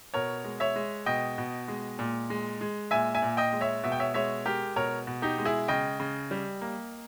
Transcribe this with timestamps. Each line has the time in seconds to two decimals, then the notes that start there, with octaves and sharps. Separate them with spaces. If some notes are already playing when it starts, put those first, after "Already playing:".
0.14 B2 A#4 C#5
0.44 G#3
0.60 C#5 E5
0.76 G#3
1.06 B2 D#5 G5
1.38 B2
1.68 G#3
1.99 A#2
2.30 G#3
2.61 G#3
2.91 A#2 E5 G#5
3.15 E5 G#5
3.22 A#2
3.37 D#5 G5
3.53 G#3
3.61 C#5 E5
3.84 B2 E5
3.92 G5
3.99 C#5 E5
4.14 G#3 C#5 E5
4.45 G#3 G4 A#4
4.76 B2 A#4 C#5
5.07 B2
5.22 D#4 G4
5.38 G#3
5.45 E4 G#4
5.68 C#3 D#5 G5
6.00 C#3
6.31 G3
6.61 A#3